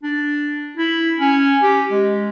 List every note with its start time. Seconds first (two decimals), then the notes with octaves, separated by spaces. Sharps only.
0.03 D4
0.77 E4
1.20 C#4
1.63 G4
1.91 G#3